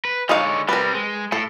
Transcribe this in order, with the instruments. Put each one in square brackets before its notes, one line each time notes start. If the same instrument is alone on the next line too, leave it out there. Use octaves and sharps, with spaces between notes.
[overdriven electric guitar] B4
[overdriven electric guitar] D3 C#5 [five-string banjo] G#3 D#4 F5
[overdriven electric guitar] G3 C4 [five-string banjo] A#4 B4
[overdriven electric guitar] G#3
[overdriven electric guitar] A2 [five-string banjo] A4